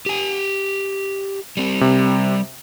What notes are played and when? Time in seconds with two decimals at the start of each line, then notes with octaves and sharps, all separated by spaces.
0.06 G4 G#5
1.57 G3 C4
1.81 C3